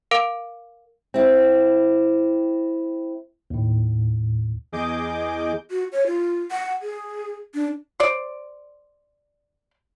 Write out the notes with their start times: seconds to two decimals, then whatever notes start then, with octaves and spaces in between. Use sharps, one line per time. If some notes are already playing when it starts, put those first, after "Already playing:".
0.11 A#4 F5 D6 D7
1.14 C4 E4
3.50 D#2 A2
4.72 E2 G#4 D#5 D6 G6
5.71 F#4
5.93 C#5
6.06 F4
6.51 F#5
6.82 G#4
7.54 D4
8.00 C5 D5